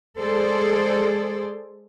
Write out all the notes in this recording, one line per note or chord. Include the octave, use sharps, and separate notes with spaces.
G#3 G#4 A4 C5 D5